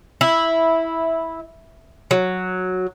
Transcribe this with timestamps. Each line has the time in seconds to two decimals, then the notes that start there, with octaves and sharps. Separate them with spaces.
0.21 E4
2.11 F#3